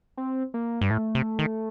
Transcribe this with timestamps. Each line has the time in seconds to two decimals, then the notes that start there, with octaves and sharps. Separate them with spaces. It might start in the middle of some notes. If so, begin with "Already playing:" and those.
0.17 C4
0.54 A#3
0.81 G2 G3
0.90 A2 A3
1.15 C3
1.39 D#3